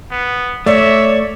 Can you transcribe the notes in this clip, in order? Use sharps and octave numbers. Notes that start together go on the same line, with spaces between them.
B3
A3 C#5 D5 E5